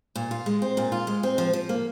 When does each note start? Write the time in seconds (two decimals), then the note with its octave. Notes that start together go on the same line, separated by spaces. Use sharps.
0.16 A#2
0.31 F4
0.46 G#3
0.62 C4
0.77 A#2
0.92 F4
1.07 G#3
1.23 C4
1.38 F3
1.53 F3
1.69 A#3